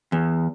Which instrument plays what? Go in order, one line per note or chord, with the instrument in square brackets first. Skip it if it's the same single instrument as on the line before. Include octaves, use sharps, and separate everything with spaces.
[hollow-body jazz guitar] E2